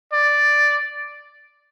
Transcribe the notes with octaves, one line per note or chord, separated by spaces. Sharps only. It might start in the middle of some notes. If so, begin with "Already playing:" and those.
D5